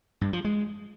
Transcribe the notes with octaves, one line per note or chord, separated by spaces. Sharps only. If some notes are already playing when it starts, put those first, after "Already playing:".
G2
F3
G#3